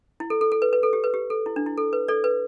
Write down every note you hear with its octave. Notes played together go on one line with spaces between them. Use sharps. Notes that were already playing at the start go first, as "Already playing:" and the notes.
E4
A4
A4
A4
B4
B4
A4
G4
B4
G4
A4
E4
D4
E4
A4
B4
A4 D5
B4